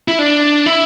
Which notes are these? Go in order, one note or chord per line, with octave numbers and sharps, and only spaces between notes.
E4
D4
E4